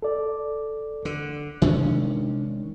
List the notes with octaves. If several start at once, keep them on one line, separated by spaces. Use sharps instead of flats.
A4 D5
D3
C3 D#3 G#3 C#4 D4